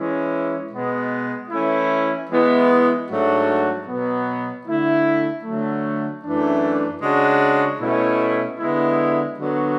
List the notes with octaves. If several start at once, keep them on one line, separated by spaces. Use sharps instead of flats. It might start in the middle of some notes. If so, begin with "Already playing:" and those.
Already playing: E3 G#3 C#4 E4
B2 G#3 B3
E3 A3 C#4 E4
E3 G#3 B3 E4
G#2 F#3 A3 D4 F#4
B2 F#3 B3
D3 A3 E4
D3 F#3 A3
F#2 E3 A3 D4
C#3 G#3 D4 F#4
B2 A3 C#4 E4
D3 G#3 B3 E4
D3 F#3 B3 F#4